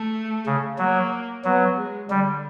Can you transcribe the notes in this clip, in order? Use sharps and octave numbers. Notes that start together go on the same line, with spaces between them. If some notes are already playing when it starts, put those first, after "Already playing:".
Already playing: A3
C#3
F#3 A#3
F#3 B3
G#3
D3 G3